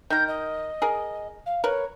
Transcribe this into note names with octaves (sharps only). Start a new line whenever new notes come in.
D#3 A#4 G6
D#5
G#4 A#4
F5
A#4 B4 C#5